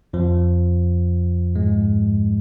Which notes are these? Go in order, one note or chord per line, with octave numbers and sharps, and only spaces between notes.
F2 F3
G#2 G#3